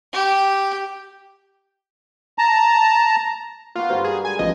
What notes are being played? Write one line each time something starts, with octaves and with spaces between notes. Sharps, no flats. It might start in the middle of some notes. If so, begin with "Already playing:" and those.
G4
A5 A#5
A#3 B3 F4 F#4
G2 D3 A#3 F#4 B4 C5
G#4
G#3 G#5
A1 F3 B3 D#5